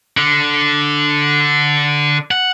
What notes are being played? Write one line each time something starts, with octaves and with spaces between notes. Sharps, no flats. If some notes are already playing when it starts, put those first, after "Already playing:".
D3
F#5